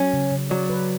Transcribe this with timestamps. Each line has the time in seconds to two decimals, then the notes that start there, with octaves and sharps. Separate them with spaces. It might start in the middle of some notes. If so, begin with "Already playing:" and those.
Already playing: F#3 C#4
0.13 C#3
0.31 C#3
0.50 F#3 D5
0.70 B4